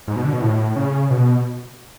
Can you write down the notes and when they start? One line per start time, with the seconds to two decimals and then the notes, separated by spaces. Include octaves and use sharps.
0.07 G#2
0.16 B2
0.25 D3
0.33 B2
0.42 A2
0.76 C#3
1.10 B2